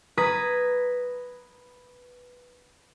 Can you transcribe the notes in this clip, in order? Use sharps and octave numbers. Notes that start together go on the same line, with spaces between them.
B4 A#5 D#6 G#6 B6